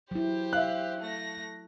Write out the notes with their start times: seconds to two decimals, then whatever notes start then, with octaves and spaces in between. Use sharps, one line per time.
0.11 F#3 E4 G4 C5
0.53 E5 F5 F#6
1.00 A3 A#6